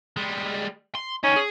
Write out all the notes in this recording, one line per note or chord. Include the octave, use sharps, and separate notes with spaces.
G3 G#3
C6
C#4 D#4 G4
G#4